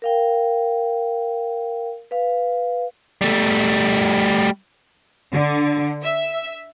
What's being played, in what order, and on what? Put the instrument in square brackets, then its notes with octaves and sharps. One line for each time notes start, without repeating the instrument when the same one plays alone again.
[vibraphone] A#4 F5 G5
B4 F5
[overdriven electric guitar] G3 A3
[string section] D3
E5